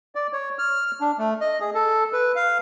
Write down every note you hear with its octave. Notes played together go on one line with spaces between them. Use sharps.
D5
C#5
F6
D4
A3
D#5
G#4
A4
B4
F5